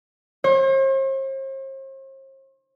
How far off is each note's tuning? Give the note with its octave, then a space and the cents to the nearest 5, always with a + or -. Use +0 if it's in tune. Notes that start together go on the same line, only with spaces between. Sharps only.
C5 +45